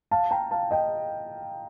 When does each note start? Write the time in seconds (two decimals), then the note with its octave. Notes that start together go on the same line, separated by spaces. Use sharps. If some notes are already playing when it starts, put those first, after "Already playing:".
0.11 F5 A5
0.31 G5 A#5
0.51 F5 A5
0.71 D#5 G5